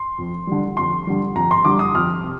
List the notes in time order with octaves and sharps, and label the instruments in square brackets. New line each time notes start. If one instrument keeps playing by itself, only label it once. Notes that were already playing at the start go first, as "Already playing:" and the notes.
Already playing: [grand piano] C6
F2
D3 G3
F2 C6
D3 G3
F2 A#5
C6
D3 G3 D6
D#6
F2 F6
C3